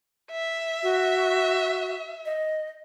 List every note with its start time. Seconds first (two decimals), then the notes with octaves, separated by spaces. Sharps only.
0.31 E5
0.83 F#4
2.25 D#5